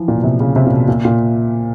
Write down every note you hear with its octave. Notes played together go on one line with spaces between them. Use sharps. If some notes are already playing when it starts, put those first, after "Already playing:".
Already playing: E3 F3
A#2
B2
C3
C#3
C3
A#2
B2
A#2
A#2